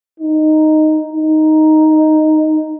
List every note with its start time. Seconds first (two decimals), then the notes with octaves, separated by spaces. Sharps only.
0.20 D#4
1.13 D#4